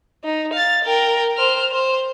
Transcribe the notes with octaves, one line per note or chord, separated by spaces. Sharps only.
D#4
F5 A6
A#4 G5
C5 F6
C5